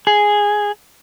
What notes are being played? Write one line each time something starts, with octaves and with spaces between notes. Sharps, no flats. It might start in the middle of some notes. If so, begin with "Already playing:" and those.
G#4